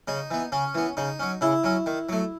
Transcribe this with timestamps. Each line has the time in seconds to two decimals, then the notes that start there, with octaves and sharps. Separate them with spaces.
0.08 C#3 D#4
0.31 E3 B3
0.52 C#3 C#4
0.75 E3 B3
0.97 C#3 D#4
1.20 F#3 C#4
1.41 C#3 E4
1.64 F#3 C#4
1.86 D#3
2.09 F#3 A3